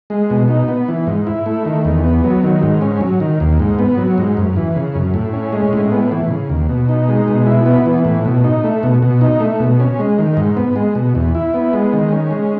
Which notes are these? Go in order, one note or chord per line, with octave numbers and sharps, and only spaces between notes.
G#3
B2
D#4
B3
E3
G#2
E4
A3
D#3
E2
B3
F#3
D#3
G#2
C#4
F#3
D#3
D#2
G#2
B3
F#3
G#2
F#2
E3
C#3
F#2
A2
C#4
G#3
A2
B3
E3
C#3
D#2
B2
D#4
G#3
B2
E4
B3
E3
A2
B2
D#4
A3
B2
B2
D#4
A3
B2
C#4
G#3
D#3
G#2
B3
G#3
B2
E2
E4
B3
G#3
D#3
C#4
G#3